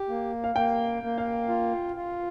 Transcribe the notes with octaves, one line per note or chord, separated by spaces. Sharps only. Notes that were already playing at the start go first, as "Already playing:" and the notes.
Already playing: G4
A#3
F5
A#3 G5
A#3
F5
F4
F4